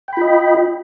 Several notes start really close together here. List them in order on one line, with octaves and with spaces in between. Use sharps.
G5 B5 F4 D#5